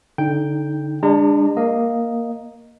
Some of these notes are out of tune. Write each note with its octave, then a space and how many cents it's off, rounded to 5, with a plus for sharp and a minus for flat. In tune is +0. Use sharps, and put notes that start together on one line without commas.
D3 -20 D#4 +0 G5 +0
G#3 -40 D4 +5 A#5 -35
A#3 +0 D#5 +0